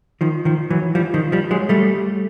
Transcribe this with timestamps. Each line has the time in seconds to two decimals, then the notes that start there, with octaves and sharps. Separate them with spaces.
0.21 D#3 F3
0.45 D#3 F3
0.70 E3 F#3
0.95 F3 G3
1.14 D#3 F3
1.32 F3 G3
1.51 F#3 G#3
1.69 G3 A3